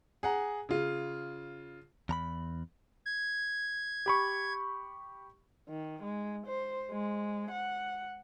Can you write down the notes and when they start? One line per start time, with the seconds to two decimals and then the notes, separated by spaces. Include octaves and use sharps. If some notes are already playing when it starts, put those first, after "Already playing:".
0.23 G#4 F#5 A#5
0.69 C#3 F4
2.09 E2 A#5 B5
3.06 G#6
4.06 G4 B5 C#6
5.69 D#3
6.03 G#3
6.47 C5
6.91 G#3
7.51 F#5